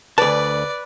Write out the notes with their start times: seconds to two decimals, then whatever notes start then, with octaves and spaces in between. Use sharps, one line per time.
0.18 D2 B4 D5 A5